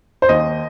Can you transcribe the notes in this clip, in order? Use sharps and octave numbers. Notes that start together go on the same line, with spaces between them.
C5
D#2 D#5